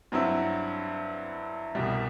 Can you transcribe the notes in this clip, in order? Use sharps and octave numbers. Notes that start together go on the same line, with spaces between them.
G2 F#3 C4 E4
C2 B2 G3